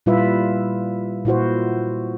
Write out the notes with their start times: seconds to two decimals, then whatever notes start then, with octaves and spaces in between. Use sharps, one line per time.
0.06 A#2 G3 E4 F4 B4 E5
1.25 A#2 E4 F#4 C5